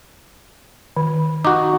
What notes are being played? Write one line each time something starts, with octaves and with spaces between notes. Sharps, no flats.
D#3
D#4 F#4 D6